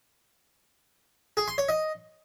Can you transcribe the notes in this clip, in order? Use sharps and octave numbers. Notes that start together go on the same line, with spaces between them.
G#4
C6
C#5
D#5